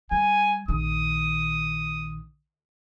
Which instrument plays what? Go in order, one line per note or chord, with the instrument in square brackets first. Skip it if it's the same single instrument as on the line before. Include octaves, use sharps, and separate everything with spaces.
[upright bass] G3 [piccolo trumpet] G#5
[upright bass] A#1 D#3 [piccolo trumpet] D#6